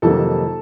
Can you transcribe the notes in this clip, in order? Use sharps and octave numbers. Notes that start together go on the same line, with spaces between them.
F2 C3 D#3 F#3 A#3 A4 A5